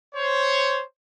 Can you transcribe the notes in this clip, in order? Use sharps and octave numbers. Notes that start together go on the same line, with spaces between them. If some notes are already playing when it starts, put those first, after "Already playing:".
C5 C#5